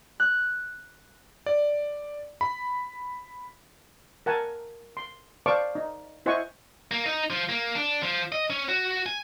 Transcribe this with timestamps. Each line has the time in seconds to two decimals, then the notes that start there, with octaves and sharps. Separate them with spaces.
0.20 F#6
1.46 D5
2.41 B5
4.26 A#4 F#5 G#5 A5
4.97 C6
5.46 C5 D5 F5 A5 C#6 D6
5.75 D#4
6.26 E4 C5 D#5 F#5 G#5 C#6
6.91 A#3
7.06 D#4
7.30 F3
7.49 A#3
7.76 D4
8.03 F3
8.32 D#5
8.50 C#4
8.69 F#4
9.06 G#5